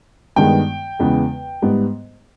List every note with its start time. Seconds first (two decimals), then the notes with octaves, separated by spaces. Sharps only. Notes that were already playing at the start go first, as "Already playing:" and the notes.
0.36 G2 D#3 G#3 B3 G5
0.99 E2 C#3 G#3 B3
1.62 G#2 G3 B3